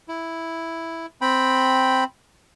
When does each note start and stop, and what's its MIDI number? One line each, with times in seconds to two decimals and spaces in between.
0.08 1.06 64
1.21 2.04 60
1.21 2.04 79
1.21 2.04 83